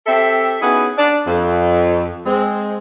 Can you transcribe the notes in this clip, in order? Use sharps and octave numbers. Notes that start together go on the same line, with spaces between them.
C4 G4 A4 E5
B3 C#4 D#4 E4 F#4 G#4
D4
F2
G#3 C4